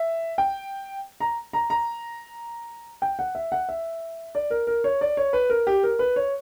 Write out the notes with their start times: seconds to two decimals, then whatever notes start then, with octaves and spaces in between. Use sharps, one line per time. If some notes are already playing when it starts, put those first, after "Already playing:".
Already playing: E5
0.38 G5
1.20 A#5
1.53 A#5
1.70 A#5
3.02 G5
3.19 F#5
3.35 E5
3.52 F#5
3.69 E5
4.35 D5
4.51 A#4
4.67 A#4
4.84 C#5
5.01 D5
5.17 C#5
5.33 B4
5.50 A#4
5.67 G4
5.83 A#4
5.99 B4
6.16 C#5